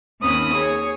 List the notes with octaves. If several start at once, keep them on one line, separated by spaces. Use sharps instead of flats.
D#2 C4 C#4 B5 D#6
G#4 C#5